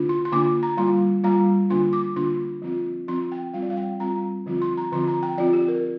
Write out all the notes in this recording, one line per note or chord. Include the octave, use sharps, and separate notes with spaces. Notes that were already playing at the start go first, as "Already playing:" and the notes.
Already playing: D3 A#3 D4 F4
C6
C6
D3 A#3 D4 F4 D6
A#5
G3 A#3 F4 C6
G3 A#3 F4 A#5
D3 A#3 D4 F4 C6
D6
D3 A#3 D4 F4 C6
F3 C4 F4
F3 C4 F4 C6
G5
G3 C4 F4 F5
D5
F5
G5
G3 C4 F4 A#5
D3 F3 C4 F4
C6
A#5
D3 F3 C4 F4 C6
A#5
G5
F3 C4 F4 D5
G4
A#4